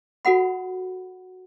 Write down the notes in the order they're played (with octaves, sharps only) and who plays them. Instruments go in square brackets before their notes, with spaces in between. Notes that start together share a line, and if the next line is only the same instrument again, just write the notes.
[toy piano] F#4 A4 F#5 B5